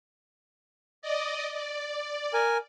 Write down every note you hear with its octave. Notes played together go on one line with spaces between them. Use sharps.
D5 D#5
D5
A#4 G#5